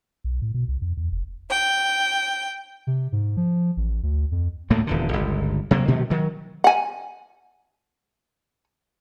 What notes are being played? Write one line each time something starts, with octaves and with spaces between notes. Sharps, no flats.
B1
A2
B2
C2
F2
E2
F1
G5
C3
G#2
F3
A1
D2
F2
D2 A2 A3 A#3
D#1 E2 D3
G1 C#2
C3 F#3 A#3
B2 D#3 F#3 A3
D#3 F#3
F#5 G#5